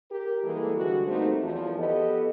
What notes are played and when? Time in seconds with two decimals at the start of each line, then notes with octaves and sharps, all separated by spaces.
0.10 G4 A#4
0.44 E3 G3 G#3 A#3 G#4 A4
0.76 D3 G3 G#3 F#4
1.07 G3 A3 A#3 C4 D#4 C5
1.43 E2 F3
1.78 B3 G4 A4 D#5